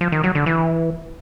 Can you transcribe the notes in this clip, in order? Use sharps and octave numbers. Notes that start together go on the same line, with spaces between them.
F3
D#3
F#3
D3
E3